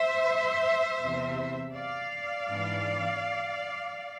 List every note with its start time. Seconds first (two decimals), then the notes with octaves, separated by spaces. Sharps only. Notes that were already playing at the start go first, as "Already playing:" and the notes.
Already playing: C5 E5
1.01 E2 C3 E3
1.75 D5 F5
2.47 G#2 E3 G#3 B3 D4